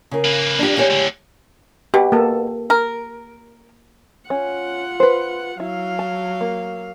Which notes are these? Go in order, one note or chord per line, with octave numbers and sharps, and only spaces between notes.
C#3 A#4
A#3 B4
D4 G4
G#3 G4 C#5
A2 D3
B2 G4
A#3 A4
A#4
C#4 F4 F#5
B4 C5
F#3 E4 F5
A5
A#3